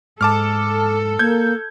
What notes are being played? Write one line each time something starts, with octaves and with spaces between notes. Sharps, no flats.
G#2 A4 A5 D6 F6
A#3 G6 G#6